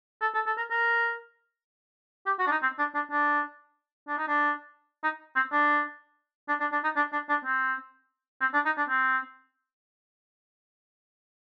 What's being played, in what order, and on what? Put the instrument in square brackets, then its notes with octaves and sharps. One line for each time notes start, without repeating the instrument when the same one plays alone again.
[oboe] A4
A4
A4
A#4
A#4
G4
F#4
D4
D#4
C4
D4
D4
D4
D4
D#4
D4
D#4
C4
D4
D4
D4
D4
D#4
D4
D4
D4
C4
C4
D4
D#4
D4
C4